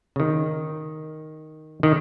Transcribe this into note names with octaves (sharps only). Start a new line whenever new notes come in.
C#3
D#3
D#3